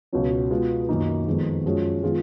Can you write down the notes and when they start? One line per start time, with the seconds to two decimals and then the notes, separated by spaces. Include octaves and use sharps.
0.12 C#2 B2 F#3 C#4
0.50 B2 G#3 B3 F4 G#4
0.89 F#2 D#3 A#3 D#4
1.27 F2 D#3 G#3 B3
1.65 F#2 F3 G#3 C#4 F#4
2.03 D#3 G#3 B3 F4 G#4